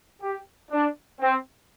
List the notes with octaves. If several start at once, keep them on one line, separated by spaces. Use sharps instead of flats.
G4
D4
C4